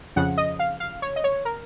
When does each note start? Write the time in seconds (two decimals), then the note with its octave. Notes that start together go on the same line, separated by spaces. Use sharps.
0.16 F2 C#3 F3 F#5
0.37 D#5
0.59 F5
0.80 F5
1.02 C#5
1.16 D#5
1.24 C#5
1.45 A#4